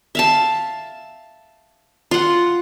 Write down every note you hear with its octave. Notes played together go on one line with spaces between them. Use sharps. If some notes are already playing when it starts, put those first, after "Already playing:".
E5 F5 A5
F4 F#5